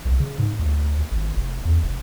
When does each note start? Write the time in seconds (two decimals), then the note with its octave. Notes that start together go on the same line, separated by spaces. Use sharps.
0.05 C2
0.20 C#3
0.38 G#2
0.59 D2
1.11 G#1
1.37 F1
1.65 E2
1.83 F1